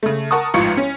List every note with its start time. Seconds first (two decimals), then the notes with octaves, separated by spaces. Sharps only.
0.03 C#3 A3
0.31 A#4 F#5 A5 C#6 D#6
0.54 A1 G#2 F3 F5 C#6 C#7
0.77 C#4